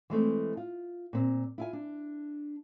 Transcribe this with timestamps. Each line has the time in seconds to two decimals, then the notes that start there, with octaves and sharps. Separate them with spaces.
0.10 E3 G#3 A3 C4
0.57 F4
1.13 A#2 C4
1.58 E4 F4 G#5
1.73 D4